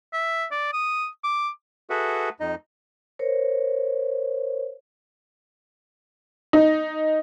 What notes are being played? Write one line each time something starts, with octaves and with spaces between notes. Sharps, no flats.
E5
D5
D#6
D6
F#4 G#4 A4 B4 E5 F#5
F2 D#4 D#5
A#4 C5 C#5
D#4